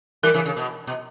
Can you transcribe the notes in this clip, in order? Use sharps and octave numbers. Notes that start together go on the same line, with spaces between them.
E3 G3 A#4
C#3 E3
C#3
B2
B2